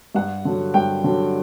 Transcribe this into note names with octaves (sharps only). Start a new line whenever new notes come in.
G2 F#5
D3 F#3
G2 G5
D3 F#3